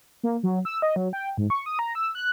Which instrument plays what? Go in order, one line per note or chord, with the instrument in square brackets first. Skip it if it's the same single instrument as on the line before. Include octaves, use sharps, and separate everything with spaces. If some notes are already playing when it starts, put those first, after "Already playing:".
[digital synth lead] A#3
F#3
E6
D#5
F#3
G5
G#2
C#6
D#6
A#5
E6
F#6